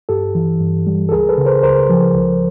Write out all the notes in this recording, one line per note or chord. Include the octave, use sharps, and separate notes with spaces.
G2 G4 A4
E3
G2
G3
A4
C#2 G#4 A#4
A4 B4
C#3
A#4 C5
C#2 A#4 C5
F3
C#2